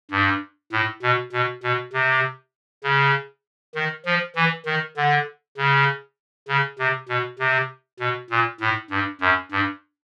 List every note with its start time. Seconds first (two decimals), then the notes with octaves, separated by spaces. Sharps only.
0.11 G2
0.72 A2
1.02 B2
1.32 B2
1.63 B2
1.93 C3
2.84 C#3
3.75 D#3
4.05 F3
4.36 E3
4.66 D#3
4.97 D3
5.57 C#3
6.48 C#3
6.79 C3
7.09 B2
7.39 C3
8.00 B2
8.30 A#2
8.60 A2
8.91 G2
9.21 F#2
9.52 G2